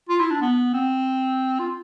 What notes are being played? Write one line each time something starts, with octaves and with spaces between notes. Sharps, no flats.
F4
E4
D4
B3
C4
F4